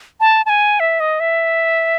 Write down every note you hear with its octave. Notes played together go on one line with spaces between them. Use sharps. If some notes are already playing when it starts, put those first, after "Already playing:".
A5
A5
G#5
E5
D#5
E5